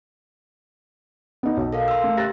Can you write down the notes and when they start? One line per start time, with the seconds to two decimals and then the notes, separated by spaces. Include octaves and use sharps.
1.43 B3 D#4
1.57 B1
1.73 A4 A#4 F5
1.88 C6 E6
2.04 A3
2.17 G4 F#6 A6 A#6